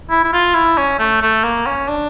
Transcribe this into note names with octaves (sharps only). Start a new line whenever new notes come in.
E4
E4
F4
E4
C#4
A3
A3
A#3
C#4
D4